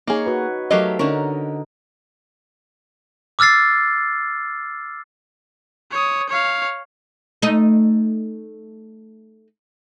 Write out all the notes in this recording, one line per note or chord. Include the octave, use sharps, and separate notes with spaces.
A#3 D#4 G#4 C#5
F#4 B4
F#3 A3 G4 A#4 D#5 F5
D3 C#4 D#4 A#4
D6 E6 F6 A6 C7
C#5 D#6
C#5 F5
A3 D#4